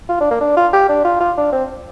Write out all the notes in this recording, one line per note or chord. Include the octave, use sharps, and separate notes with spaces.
F4
D4
A#3
D4
F4
G4
D4
F4
F4
D4
C4